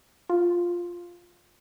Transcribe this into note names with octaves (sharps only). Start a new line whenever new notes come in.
F4